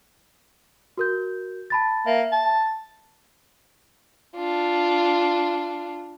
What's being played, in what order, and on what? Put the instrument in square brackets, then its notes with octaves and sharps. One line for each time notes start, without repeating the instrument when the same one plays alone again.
[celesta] F#4 A#4 G6
A5 B5 A6
[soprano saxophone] A#3 [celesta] E5
[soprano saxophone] A5
[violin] D4 F4